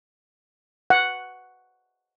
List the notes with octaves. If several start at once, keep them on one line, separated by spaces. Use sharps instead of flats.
F#5